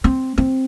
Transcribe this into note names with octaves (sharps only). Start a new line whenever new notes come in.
C4
C4